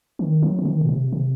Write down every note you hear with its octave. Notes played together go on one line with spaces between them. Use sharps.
D#3
F#3
D3
D#3
A#2
C3
C3